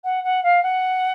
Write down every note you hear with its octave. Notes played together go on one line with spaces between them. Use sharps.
F#5
F#5
F5
F#5